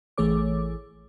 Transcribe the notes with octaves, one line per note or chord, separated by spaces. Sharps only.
A1 E3 A3 G#4 C#5 D6